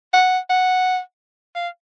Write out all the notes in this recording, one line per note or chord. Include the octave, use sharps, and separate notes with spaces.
F#5
F#5
F5